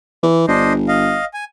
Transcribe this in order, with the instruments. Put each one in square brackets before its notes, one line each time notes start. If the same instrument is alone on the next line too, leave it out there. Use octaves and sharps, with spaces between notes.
[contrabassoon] E3
[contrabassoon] G1 [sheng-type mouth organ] D4 C5 D#5
[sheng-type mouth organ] D#5 F5
G#5